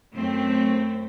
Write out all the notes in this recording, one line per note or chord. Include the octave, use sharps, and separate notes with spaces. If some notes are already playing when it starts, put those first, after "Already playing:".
F#2 A3 C4